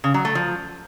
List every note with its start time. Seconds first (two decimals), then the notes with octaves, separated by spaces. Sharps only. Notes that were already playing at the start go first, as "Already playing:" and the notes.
0.04 C#3
0.14 F#3
0.25 A3
0.35 F3